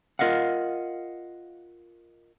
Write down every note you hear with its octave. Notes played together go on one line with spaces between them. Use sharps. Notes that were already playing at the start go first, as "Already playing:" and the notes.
F4 A#4 D#5 F5 F#5